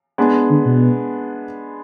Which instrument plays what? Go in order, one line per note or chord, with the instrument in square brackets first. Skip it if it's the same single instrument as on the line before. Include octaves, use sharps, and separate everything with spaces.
[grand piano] G#3 B3 D4
[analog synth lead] D3
B2